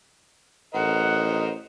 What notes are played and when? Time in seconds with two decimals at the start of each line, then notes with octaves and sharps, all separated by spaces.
0.74 A1 A#4 C5 D#5 F#5